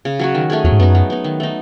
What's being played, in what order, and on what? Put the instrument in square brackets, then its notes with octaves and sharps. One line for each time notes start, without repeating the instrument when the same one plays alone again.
[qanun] C#3
F#3 C#4 F#4
D#3
A3 C#4 G#4
[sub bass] E2 [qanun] F#3
[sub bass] G#2
[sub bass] F#2 [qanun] B3 D#4
[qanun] F#3
B3 D#4
D#3
A3 D#4